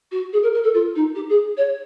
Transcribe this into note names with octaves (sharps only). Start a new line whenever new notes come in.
F#4
G#4
A#4
A#4
A4
F4
D#4
G4
G#4
C#5